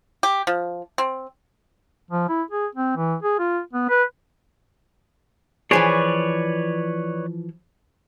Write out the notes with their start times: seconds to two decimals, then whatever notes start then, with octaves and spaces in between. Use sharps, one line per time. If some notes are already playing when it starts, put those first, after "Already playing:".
0.23 G4
0.47 F3
0.98 C4
2.11 F3
2.29 E4
2.51 G#4
2.75 C4
2.97 E3
3.23 G#4
3.39 F4
3.73 B3
3.89 B4
5.71 E3 F3 G#4 B4 C#5 D5